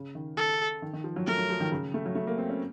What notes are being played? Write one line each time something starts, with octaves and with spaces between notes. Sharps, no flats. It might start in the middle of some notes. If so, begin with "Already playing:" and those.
Already playing: C#3
D#3
A4
D#3
D#3
F3
F#3
A3 A#4
F#3
F3
D#3
C#3
A3
F#3
A3
A#3
C4
C#4